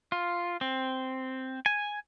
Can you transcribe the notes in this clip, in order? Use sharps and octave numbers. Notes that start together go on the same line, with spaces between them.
F4
C4
G#5